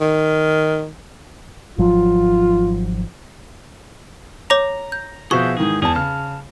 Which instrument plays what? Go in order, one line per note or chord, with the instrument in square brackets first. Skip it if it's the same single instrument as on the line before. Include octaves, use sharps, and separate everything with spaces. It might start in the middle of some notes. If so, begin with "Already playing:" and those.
[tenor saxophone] D#3
[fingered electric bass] G#1 F3 F#3 [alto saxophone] F4
[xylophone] C#5 D6 F7 [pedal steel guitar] A#5
[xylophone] G6
[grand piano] B2 F3 F#4 [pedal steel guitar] G#4 E5 G6 [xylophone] C#6
[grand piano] G#2 D#3 E3 [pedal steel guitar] G#4
[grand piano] E2 A5 [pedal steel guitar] G#4
[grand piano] C#3 [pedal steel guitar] A5 F6